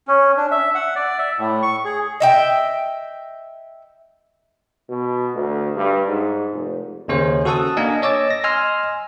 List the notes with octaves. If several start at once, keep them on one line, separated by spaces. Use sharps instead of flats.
C#4
D4
E5
F#5
D5
E5
A2
C#6
G#4
D#5 E5 G5
B2
D2
G2
G#2
F1
D#2 C#3 C#4 C5 C#5
F#4 A4 F#5 A5 D#6 E6
A#3 D4 A#4 D#5 G#5
C#5 D#5 D6 E6 A6
A#6
D#5 G#5 C6 E6 F6